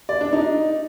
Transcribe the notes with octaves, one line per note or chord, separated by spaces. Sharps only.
D5
D4
D#4